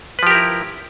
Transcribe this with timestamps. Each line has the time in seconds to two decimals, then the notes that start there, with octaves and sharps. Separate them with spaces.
0.19 B4
0.23 F3
0.27 G4
0.31 A#4
0.35 E4